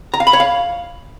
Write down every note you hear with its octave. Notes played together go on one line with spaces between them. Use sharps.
A#5
F5
B5
C#5
F5